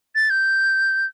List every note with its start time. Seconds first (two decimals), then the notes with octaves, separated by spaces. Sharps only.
0.15 A6
0.30 G6